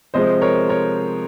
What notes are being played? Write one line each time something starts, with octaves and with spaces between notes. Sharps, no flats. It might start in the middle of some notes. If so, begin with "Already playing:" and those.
C3 F3 G#3 C5 D#5
A#4 C#5
A#4 C#5